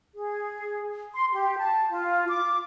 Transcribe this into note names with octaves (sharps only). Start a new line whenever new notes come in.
G#4
C6
G4
A5
F4
D6